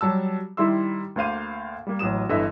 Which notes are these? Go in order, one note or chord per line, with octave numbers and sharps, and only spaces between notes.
F#3 G3 A5 E6
D#3 G3 E4 E5 C6 E6
D2 A#3 C5 F5 D#7
G3 A#3
A1 F#3 D#6 E7
G1 D3 E3 D#5 E5 E6